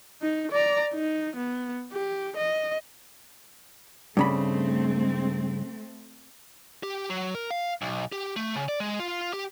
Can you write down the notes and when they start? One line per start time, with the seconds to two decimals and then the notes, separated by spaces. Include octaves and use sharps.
0.22 D#4
0.52 D5 A#5
0.93 D#4
1.36 B3
1.92 G4
2.36 D#5
4.17 G2 C#3 A3 C4 B5
6.83 G4
7.10 F#3
7.35 A#4
7.51 F5
7.82 B1
8.12 G4
8.36 A3
8.56 C#3
8.69 D5
8.80 G#3
9.00 F4
9.33 G4